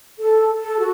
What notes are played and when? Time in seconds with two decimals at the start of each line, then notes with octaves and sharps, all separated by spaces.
0.19 A4
0.60 A4
0.80 F#4